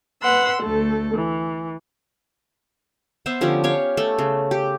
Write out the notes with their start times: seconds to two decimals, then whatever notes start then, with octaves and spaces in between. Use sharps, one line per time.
0.23 B4 F#5 C6 E6
0.61 D2 A3 A4
1.15 E3
3.26 B3 C5 E5
3.41 D3 F3 C#4 G4
3.64 G4 C#5 F5
3.97 A3
4.19 C#3
4.51 G4